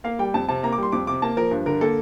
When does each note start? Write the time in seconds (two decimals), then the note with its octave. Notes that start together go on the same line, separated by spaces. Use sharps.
0.04 A#3 F5
0.19 G3 G5
0.34 F2 A5
0.49 C3 A5
0.63 A#3 A#5
0.72 D6
0.78 G3 C6
0.92 F2 D6
1.07 C3 D6
1.22 A#3 A5
1.37 F3 A#4
1.51 G2
1.66 D3 A#4
1.81 A#3 A4